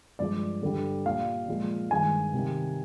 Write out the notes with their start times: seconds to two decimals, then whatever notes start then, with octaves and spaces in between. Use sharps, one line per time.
0.19 G2 F3 G#3 D5
0.63 G2 D3 G3
1.05 A#2 G3 F5
1.48 A#2 F3 G#3
1.91 G2 D#3 G#3 G#5
2.34 C3 D#3 G3